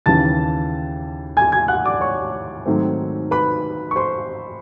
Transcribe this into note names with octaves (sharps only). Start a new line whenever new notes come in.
D#2 C#3 E3 A5 A6
G#5 G#6
G#5 G#6
F#5 F#6
D5 D6
C#5 C#6
G#2 D#3 F#3 A3 C4
B4 B5
C#6
C5 C6